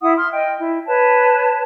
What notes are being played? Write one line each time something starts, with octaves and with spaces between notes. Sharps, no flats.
E4 F#5 D#6
C6 F6
D#5 G5
E4
B4 C#5 A5